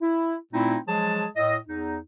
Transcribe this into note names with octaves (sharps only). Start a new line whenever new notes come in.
E4
A#2 A3 C4 D#4 E4
F3 F#3 G#3 G#4 A5
A2 D#5
E2 D#4